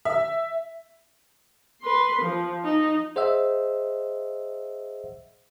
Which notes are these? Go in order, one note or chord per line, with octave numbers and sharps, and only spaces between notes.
E5
B4 C6
F3
D#4
G#4 C5 D#5 E5 F#5 E6